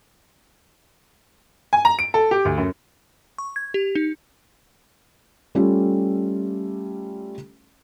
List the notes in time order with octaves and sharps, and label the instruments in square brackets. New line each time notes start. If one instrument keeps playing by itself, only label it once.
[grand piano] G#5
A#5
D7
A4
G4
D2
F#2
[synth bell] C#6
G#6
G4
D#4
[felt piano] G3 A3 C#4 F4 G4 A4